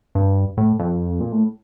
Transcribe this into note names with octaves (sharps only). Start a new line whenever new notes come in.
G2
A2
F2
A#2
A2